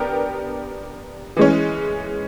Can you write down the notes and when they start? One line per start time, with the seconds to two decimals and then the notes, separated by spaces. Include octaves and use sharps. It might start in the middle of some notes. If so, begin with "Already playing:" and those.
Already playing: B3 D4 G4 A#4
1.37 E3 G#3 C#4